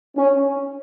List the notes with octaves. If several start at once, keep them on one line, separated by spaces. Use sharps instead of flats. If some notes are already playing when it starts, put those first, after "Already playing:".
C#4